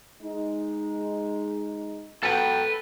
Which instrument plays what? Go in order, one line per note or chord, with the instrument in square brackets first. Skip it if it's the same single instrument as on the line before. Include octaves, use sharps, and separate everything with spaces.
[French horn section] G#3 D#4
[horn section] F#3 B3 G5 [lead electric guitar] A4 B4